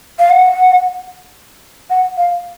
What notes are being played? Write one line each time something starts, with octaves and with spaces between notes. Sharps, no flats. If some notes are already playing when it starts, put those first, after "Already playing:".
F5
F#5
F#5
F5